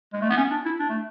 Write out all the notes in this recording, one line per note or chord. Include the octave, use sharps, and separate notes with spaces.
G#3
A3
B3
C#4
D4
E4
D4
A3